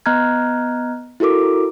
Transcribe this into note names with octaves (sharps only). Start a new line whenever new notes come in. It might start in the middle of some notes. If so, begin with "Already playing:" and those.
B3 D#5 A#5 F6 F#6 G#6
E4 F#4 A4 A#4 D6